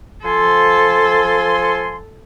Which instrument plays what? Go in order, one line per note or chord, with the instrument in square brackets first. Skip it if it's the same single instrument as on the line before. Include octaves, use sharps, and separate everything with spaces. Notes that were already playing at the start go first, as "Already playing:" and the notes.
[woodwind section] F3 G#5 C6 [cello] A4